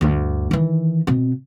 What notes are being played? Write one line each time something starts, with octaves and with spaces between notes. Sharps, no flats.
D2 G2
D#3 E3
B2 C4